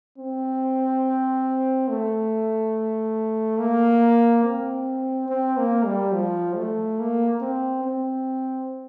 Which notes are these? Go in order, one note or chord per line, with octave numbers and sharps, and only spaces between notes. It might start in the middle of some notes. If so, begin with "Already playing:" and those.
C4
A3
A#3
C4
C4
A#3
G3
F3
A3
A#3
C4
C4